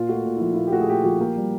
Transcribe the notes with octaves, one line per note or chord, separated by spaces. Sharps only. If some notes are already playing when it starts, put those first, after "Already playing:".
Already playing: A#2 F4
A3 F#4
A#2
E4
F3 F4
E4
A#2 F4
G4
A3 F#4
G#4
A#2 G4
F3 F#4
A#3 G4
G3